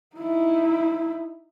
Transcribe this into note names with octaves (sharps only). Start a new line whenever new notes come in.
D#4 E4